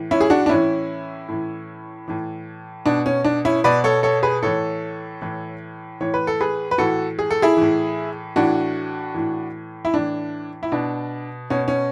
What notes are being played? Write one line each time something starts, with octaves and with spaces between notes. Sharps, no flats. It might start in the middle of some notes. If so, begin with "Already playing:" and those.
Already playing: A2 E3
C#4 E4
G#4
D4 F#4
D4
A2 E3 C#4 E4
A2 E3
A2 E3
B2 D4
C#4
D4
C#4 E4
B2 B4 D5
A4 C#5
A4 C#5
G#4 B4
A2 E3 A4 C#5
A2 E3
A2 E3 C#5
B4
A4
G#4 B4
B4
A2 E3 F#4 A4
G#4
A4
E4 G#4
A2 E3
A2 E3 D4 F#4
A2 E3
E4
A2 E3 D4
E4
B2 D4
B2 C#4
C#4